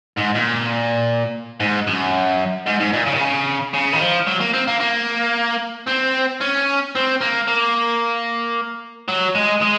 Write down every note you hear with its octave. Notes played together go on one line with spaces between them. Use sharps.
G#2
A#2
G#2
F#2
G#2
G#2
A#2
C#3
D#3
C#3
C#3
D#3
F3
F#3
A#3
C4
A#3
A#3
C4
C#4
C4
A#3
A#3
F#3
G#3
G#3